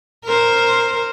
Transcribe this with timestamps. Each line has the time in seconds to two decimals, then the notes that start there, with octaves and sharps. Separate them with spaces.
0.25 A#4 C5